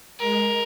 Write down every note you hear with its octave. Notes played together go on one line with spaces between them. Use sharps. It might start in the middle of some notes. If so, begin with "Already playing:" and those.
G#3 A#4